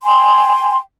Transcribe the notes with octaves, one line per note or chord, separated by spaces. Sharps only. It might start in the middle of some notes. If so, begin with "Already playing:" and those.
G5 G#5 C6